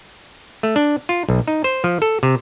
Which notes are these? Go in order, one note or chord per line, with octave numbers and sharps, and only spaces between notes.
A3
D4
F4
B1
D#4
C5
F3
A4
C3